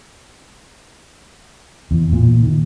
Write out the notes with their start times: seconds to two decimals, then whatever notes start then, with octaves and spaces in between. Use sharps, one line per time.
1.91 E2
2.12 A#2
2.43 D#3